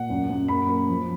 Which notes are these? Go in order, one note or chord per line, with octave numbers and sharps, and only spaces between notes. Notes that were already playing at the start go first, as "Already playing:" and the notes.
Already playing: A#2 F#5
F#2
F#2
A#3 B5
A#3
F3